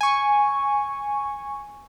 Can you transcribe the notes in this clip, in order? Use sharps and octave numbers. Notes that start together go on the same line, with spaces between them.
G#5 C#6